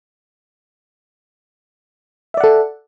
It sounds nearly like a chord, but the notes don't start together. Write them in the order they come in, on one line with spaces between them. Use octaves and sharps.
E5 D5 F#5 A4